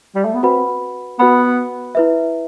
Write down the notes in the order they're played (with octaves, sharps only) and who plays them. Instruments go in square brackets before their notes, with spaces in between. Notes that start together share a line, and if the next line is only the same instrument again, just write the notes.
[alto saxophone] G3
A3
B3
[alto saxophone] C4 [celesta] F#4 B4 F#5 B5
[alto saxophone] B3 [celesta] F#4 B4 F#5 B5
[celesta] E4 B4 E5